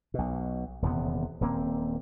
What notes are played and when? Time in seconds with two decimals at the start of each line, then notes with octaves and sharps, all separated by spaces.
0.14 B1 B2
0.82 D#1 E2 C3 B3
1.41 D#1 G2 A#3 C4